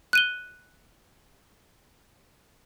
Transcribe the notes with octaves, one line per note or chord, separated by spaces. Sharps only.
F#6 D#7 G7